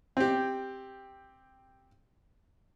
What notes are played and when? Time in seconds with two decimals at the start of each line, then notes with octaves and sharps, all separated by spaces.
0.17 C4 G4